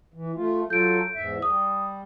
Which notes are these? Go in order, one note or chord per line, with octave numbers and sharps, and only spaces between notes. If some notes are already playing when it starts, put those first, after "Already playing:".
E3
A3 F4
F#3 F4 A4 G6 D7
E2 G#2 E5
G3 D#6